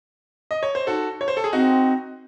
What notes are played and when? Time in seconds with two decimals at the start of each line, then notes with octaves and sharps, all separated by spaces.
0.51 D#5
0.63 C#5
0.75 C5
0.87 D#4 F#4 A4
1.21 C#5
1.28 C5
1.37 A4
1.44 G#4
1.53 C4 D#4 F#4